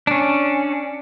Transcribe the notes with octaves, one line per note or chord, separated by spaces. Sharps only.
C#4 D4